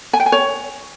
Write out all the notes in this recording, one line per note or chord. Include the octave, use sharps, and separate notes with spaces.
G#5
G5
G#5
C#5